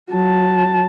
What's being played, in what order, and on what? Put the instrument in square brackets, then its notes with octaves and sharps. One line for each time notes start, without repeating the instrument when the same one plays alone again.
[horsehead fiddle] F#3 A5